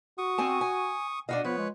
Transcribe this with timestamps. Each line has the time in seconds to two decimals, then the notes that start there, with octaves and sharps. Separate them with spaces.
0.18 F#4 C#6 D#6
0.38 C4 G#5 A5
0.61 G#5
1.29 B2 D4 F#4 D#5 F5
1.45 F3 B3 B4 C#5
1.58 G#3